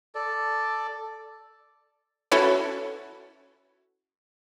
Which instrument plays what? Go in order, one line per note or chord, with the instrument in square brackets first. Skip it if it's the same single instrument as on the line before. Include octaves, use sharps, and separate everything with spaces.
[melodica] A4 D5
[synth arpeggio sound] C#4 E4 F#4 A4 B4 C#5